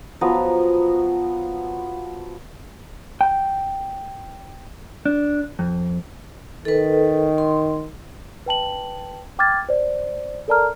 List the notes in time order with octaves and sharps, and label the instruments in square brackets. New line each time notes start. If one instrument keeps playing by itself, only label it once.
[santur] F3 F#3 B3 A#5
[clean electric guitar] G5
D4
F2
[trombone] D#3 [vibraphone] A4 B4
[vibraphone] C6
[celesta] B4 G5 A5 F#7
G5 D6 F6 G#6 A6
C5 D5
A4 A#4 D5 A5 A#5 F6